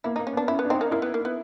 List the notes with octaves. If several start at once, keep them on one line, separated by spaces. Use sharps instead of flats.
A#3 E4
A#3 D#4
C#4
B3
D4
C#4 E4
B3
D4
C4 D#4
A#3
A#3 E4
B3
A#3
B3